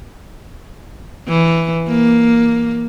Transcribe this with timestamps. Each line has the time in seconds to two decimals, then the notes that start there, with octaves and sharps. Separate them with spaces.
1.28 E3
1.88 A#3